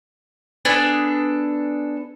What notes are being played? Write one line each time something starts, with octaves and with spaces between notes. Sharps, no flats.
B3 D4 G#4 A4